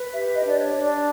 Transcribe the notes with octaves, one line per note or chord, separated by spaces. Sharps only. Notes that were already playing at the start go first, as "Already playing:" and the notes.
Already playing: B4
G4 E5
D#5
D4 D5
C#5
D4
D5